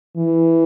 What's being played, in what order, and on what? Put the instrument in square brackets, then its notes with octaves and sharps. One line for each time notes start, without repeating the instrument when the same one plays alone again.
[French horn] E3